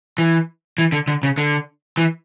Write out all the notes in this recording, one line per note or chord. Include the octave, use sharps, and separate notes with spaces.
E3
E3
D3
D3
C#3
D3
E3